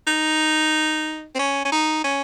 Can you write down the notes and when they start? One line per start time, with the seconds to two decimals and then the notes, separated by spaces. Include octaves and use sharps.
0.07 D#4
1.35 C4
1.39 C#4
1.65 C#4
1.72 D#4
2.04 C#4